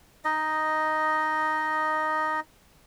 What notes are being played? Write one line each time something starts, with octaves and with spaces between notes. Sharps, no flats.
D#4 D#5